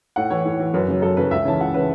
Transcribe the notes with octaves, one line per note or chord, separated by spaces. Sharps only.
A2 F#5
E3 C#5
A2
E3
F#2 B4
C#3 F#3
F#2 A4
C#3 F#3 B4
C#2 E5
C#3 E3 A5
C#2 F#5
C#3 E3 B4